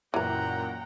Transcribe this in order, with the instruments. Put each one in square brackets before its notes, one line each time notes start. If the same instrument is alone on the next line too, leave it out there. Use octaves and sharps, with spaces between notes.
[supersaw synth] F#2 A#2 [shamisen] E3 A#4 [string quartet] F#5 G5 A#5